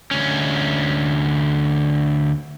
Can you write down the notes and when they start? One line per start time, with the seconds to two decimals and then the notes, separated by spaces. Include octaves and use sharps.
0.11 D2 C#4